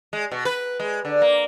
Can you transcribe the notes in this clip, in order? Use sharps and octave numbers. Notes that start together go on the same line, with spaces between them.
G#3
B2
B4
G#3
D3
A#3